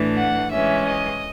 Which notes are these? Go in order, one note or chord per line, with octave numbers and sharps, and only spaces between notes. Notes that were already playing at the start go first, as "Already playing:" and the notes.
Already playing: A2 E3 A3 D4
F#5
E3 G#3 C#4 E5
D#5